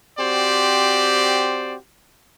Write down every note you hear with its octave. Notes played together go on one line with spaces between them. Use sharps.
C4 F#4 G4 C5 D5